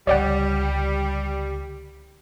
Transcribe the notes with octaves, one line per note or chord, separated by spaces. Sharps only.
C#2 D3 G3 C#5 D5 F#5